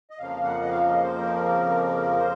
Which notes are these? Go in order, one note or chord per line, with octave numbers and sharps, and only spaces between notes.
D#5
F2 C#3 F3 A#3 F5
F#5
D#5
F5
D#5
C5
A#4
C5